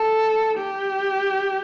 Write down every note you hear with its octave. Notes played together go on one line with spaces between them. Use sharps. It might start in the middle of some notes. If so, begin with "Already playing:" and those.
Already playing: A4
G4